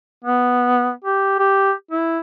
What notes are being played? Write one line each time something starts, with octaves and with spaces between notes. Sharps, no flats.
B3
G4
G4
E4